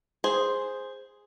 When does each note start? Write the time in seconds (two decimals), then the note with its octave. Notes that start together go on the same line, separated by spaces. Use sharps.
0.24 G#4 C5